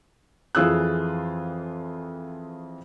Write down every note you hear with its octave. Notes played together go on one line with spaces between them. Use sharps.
F2 E3 F4 G#4 E6 F#6